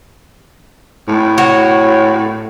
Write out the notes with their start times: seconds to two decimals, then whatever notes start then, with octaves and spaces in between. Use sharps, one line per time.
1.08 A2
1.38 F#4 C#5